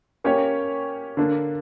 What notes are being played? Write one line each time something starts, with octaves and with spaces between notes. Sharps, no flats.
A#3 C#4 G4 C#5
D3 A#3 D4